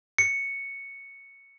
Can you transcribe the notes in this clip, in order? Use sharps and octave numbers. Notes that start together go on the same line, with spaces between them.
C#7